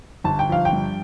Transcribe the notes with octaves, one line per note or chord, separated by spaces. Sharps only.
G1 A5
G5
F3 F5
G5
G2